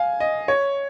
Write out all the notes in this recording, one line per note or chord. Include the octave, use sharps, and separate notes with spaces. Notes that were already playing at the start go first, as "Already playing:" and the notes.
Already playing: F5 G#5
D#5
C#5